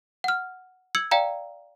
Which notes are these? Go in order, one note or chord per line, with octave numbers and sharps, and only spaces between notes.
F#5 F6
E6 G#6 C#7 F#7
D5 F5 G5 A#5